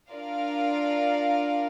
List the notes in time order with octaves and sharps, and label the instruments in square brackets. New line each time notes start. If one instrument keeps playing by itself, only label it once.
[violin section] D4 F4 A#4 D5 F5